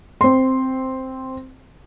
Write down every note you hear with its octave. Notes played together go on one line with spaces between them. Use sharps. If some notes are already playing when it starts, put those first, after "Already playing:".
C4 C6